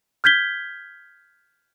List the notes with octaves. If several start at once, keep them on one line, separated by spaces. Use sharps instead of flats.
F6 G6 G#6 B6 G7